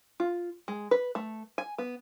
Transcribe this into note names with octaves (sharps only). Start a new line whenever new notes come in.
F4
G#3
B4
A3
G#5
B3